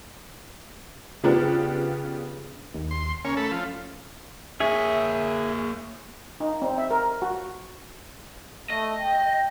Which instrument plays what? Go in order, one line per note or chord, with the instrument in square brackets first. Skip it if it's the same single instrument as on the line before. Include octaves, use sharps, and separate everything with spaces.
[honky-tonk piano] C#3 F3 B3 D4 F4 G4
[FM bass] D#2
[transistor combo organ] C6
[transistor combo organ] C#3 A#3 C#5 [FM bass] C#4
[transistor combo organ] A3 A4 B5
F3 F4
[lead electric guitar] A#3 C#5 [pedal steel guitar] G#4 E5
[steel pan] D#4
C4
E5
A#4
F#4
[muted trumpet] A3 [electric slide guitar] D#5
[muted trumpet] G5